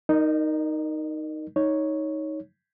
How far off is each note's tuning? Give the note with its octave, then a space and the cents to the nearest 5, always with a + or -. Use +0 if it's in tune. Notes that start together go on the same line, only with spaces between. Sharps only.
D#4 +0 A#4 +0 D#5 -45
D#4 +10 C#5 +0